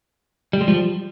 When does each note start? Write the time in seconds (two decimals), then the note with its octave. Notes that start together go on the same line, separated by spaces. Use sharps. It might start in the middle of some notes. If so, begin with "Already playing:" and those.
0.53 G3
0.61 G#3
0.68 F3 G3